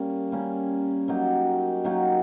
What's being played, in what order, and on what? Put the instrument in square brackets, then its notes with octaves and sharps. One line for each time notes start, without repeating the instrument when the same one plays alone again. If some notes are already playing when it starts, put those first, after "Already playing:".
Already playing: [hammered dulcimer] G3 A#3 C#4
G3 A#3 C#4
F#3 A#3 D#4 G4
F#3 A#3 D#4 G4